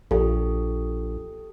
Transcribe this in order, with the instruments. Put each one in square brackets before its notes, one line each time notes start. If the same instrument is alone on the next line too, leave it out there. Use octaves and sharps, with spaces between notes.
[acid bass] A#1 [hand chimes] G4 A4